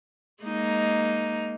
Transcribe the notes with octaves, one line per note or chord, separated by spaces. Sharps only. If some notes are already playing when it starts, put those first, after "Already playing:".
G#3 A#3 D#4